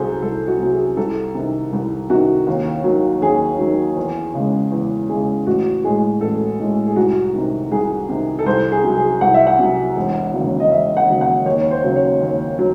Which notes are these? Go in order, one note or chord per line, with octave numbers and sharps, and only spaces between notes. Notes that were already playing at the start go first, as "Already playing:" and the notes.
Already playing: C2 C3 F#3 G#4 A4 C5
C2 A4
F#4
C3 F#3
G#4
C2 A4
C3 D#3
C2
C3 D#3 F#4
D#2
D#3 F#3
D#2 G#4
D#3 F#3
E2
C#3 G#3
E2
C#3 G#3 G#4
A1 F#4
A2 G#3 G#4
A1 A4
A2 G#3
G#4
C2 F#4
C3 D#3
C2 G#4
C3 D#3
A4
C2 C5
G#4
C3 F#3
G#4
C2 F#5
E5
F#5
C3 F#3
E1
D#2 C#3 F#3
D#5
E1 E5
F#5
D#2 C#3 F#3
F#5
D#2 C#5
C5
C#3 F#3
C#5
D#2
F#3